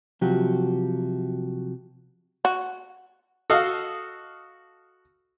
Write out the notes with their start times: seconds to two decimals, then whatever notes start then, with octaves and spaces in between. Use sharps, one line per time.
0.21 C3 F3 F#3 F#4 G4
2.45 F#4
3.50 F#4 A4 D#5 F5